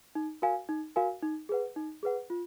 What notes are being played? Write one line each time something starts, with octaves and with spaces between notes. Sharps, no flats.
D#4
F#4 A#4 F5 G#5
D#4
F#4 A#4 F5 G#5
D#4
G#4 B4 F#5
D#4
G#4 B4 F#5
F4